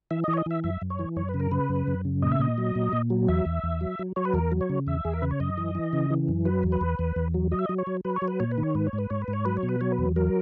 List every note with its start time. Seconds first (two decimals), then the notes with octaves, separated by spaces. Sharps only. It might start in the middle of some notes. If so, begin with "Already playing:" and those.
0.11 E3 E5
0.24 E3 D#5
0.33 C#5
0.37 D#5
0.46 E3 E5
0.64 F#2 E5
0.81 F#2
0.90 C#5
0.99 E3
1.16 F#2 C#5
1.29 B4
1.34 C#3
1.40 A#4
1.51 C#3 B4
1.69 F#2
1.87 F#2
2.05 C#3
2.22 A#2 D#5
2.32 E5
2.40 A#2 D#5
2.58 F#3
2.75 A#2
2.93 A#2
3.10 F#3
3.28 E2 E5
3.46 E2
3.63 E2
3.81 F#3
3.99 F#3
4.16 F#3 C#5
4.25 B4
4.34 E2 A#4
4.52 F#3
4.61 C#5
4.69 C#3
4.87 E2 E5
5.05 E2 G#4
5.13 A#4
5.22 C#3 B4
5.31 C#5
5.40 F#2 D#5
5.58 E3
5.75 E3
5.93 C#3
6.10 E3
6.28 F#2
6.45 F#3 B4
6.63 E2
6.72 B4
6.81 E2
6.99 E2
7.16 E2
7.34 F#3
7.51 F#3 D#5
7.59 E5
7.66 D#5
7.69 F#3
7.78 C#5
7.87 F#3
8.05 F#3 B4
8.16 C#5
8.22 F#3
8.28 B4
8.40 A#2 C#5
8.51 B4
8.58 D#3
8.63 C#5
8.75 G#2 B4
8.87 C#5
8.93 G#2
8.98 B4
9.10 G#2 C#5
9.22 B4
9.28 G#2
9.33 C#5
9.45 F#3 B4
9.57 C#5
9.63 B2
9.69 B4
9.81 F#3 C#5
9.92 B4
9.99 E2
10.16 F#3 A#4